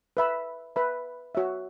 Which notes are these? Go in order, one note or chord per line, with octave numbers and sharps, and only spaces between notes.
B4 E5 B5
B4 E5 B5
F#4 C#5 E5